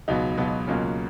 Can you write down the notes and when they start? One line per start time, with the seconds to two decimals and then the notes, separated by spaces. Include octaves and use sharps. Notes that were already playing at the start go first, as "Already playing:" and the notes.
0.08 C#2 B2 F#3 B3 D#4
0.37 C#2 B2 F#3 B3
0.67 C#2 B2 F#3 A#3 C#4 F4